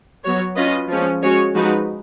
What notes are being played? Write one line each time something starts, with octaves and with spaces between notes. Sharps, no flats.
F#3 B3 F#4 C#5
C#4 F4 B4 D#5
F3 G#3 C#4
G#3 C#4 F#4 C#5
F3 G#3 D#4 F#4 B4